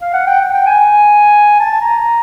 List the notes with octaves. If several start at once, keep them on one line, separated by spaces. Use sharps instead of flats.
F5
F#5
G5
F#5
G5
G#5
A5
A#5